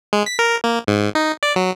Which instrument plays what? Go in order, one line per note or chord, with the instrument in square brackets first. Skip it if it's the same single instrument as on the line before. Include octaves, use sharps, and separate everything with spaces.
[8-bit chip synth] G#3
B6
A#4
A#3
G#2
D#4
D5
F#3